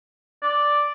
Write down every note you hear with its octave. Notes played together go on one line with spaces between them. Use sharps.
D5